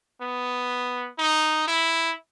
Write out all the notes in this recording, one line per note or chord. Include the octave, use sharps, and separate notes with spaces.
B3
D#4
E4